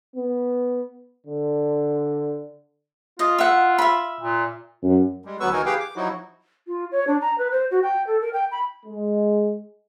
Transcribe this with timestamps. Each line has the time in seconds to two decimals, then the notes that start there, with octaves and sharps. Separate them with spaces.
0.16 B3
1.26 D3
3.19 F4 D#5
3.38 E5 F#5
3.78 E5 B5
4.21 A#2
4.83 F#2
5.25 G3 G#3
5.40 D2 F#3 B3 B4 C#6 E6
5.53 D2 E3 D#4 F#4 A#4 G#5
5.66 G4 G#4 B4 F5 G5
5.80 D6
5.96 F3 F#3 D#4 E4 F#4
6.67 F4
6.92 C#5
7.07 D4
7.21 A#5
7.38 B4
7.51 C5
7.71 F#4
7.83 G5
8.07 A4
8.21 A#4
8.33 G5
8.51 B5
8.86 G#3